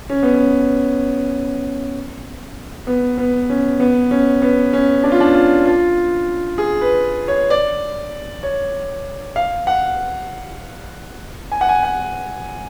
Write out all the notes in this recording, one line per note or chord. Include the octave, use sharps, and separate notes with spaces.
C#4
B3
C#4
B3
B3
C#4
B3
C#4
B3
C#4
D4
F4
D4
F4
F4
G#4
B4
C#5
D5
C#5
F5
F#5
G#5
F#5
G#5
F#5